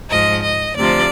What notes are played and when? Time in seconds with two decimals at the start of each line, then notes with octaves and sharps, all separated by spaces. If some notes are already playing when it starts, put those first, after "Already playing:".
0.10 G#2 F3 D#5
0.43 D#5
0.76 D2 C3 F3 D5